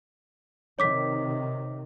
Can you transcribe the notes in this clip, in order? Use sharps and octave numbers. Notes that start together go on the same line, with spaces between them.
C3 D#3 C#5 D6 B6